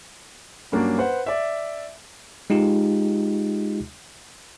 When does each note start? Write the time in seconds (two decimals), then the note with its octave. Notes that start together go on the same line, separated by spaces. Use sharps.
0.72 G2 F#3 A#3 C#4 D4
0.98 B4 C5 F#5
1.26 D5 E5
2.50 G#3 D#4 F4 G4